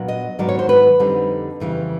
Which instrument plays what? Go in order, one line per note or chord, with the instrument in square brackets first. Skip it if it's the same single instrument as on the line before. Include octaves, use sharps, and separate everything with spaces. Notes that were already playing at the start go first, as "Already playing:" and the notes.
Already playing: [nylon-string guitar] A#2 F#3 B3 D4
D#5
G#2 D#3 F#3 B3 D5
C#5
C5
B4
F2 D3 G3 C4 D#4
F2 C#3 E3 G3